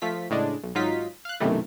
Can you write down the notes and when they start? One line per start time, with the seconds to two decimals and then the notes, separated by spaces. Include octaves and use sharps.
0.02 F3 A3 F4 B6
0.30 A2 C#3 G#3 D4
0.63 B1
0.75 G#1 F#3 D#4 F4 B6
1.25 F5 F#6
1.40 B1 F#2 C3 D#3 E3 A3